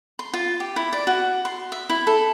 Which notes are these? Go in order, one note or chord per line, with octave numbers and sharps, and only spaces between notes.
C6
F4
G4
E4
D5
F#4
C6
E5
E4
A4